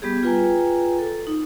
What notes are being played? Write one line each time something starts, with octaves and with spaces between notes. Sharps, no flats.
G3 B3 G4 G#4
F4 G#4 B4 G5 G#5 A#5
A4
D#4